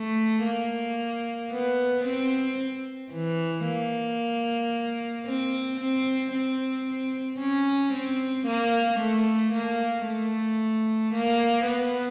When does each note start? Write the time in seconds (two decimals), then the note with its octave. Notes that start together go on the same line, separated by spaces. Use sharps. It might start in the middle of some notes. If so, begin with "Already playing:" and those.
Already playing: A3
0.45 A#3
1.51 B3
2.05 C4
3.13 E3
3.66 A#3
5.26 C4
5.80 C4
6.33 C4
7.39 C#4
7.93 C4
8.47 A#3
9.00 A3
9.53 A#3
10.06 A3
11.14 A#3
11.66 B3